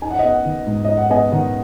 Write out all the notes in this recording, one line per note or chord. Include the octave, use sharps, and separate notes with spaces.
D#4 G#5
F#5
D#5
B3 F#5
D#3
G#2
D#4 D#5
F#5
B3 D#5 G#5
D#3 F#5